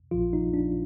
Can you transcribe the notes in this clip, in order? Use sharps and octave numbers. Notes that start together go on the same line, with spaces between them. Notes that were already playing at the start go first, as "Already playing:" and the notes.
A#1 A#2 F3 F4
D#4
D4